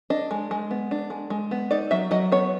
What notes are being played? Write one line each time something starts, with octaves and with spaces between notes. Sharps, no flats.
D4 D#5
G#3
G#3
B3
D4
G#3
G#3
B3
D#4 D5
F#3 E5
F#3 D#5
B3 C#5